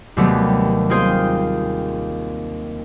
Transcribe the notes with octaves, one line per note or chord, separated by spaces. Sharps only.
D#2 C3 F#3 G3 A3 B3
A#3 C4 D#4 F4 G#4 C5